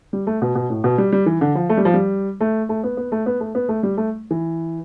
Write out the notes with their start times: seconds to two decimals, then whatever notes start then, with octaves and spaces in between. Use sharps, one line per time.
0.13 G3
0.27 A3
0.42 B2
0.55 B2
0.70 A2
0.84 B2
0.98 G3
1.12 G3
1.26 E3
1.41 D3
1.55 F3
1.69 A3
1.77 G3
1.85 F3
1.94 G3
2.41 A3
2.69 A3
2.84 B3
2.97 B3
3.12 A3
3.26 B3
3.40 A3
3.55 B3
3.69 A3
3.83 G3
3.97 A3
4.31 E3